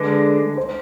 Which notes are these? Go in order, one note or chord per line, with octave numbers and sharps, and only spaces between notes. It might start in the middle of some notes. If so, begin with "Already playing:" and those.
Already playing: D3 G#3 D4 B4
C5